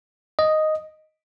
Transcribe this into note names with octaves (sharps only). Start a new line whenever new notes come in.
D#5